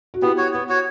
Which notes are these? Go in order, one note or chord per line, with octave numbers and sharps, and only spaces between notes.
F#4
B3 E4 G4
F#4 C#5
B3
F#4 C#5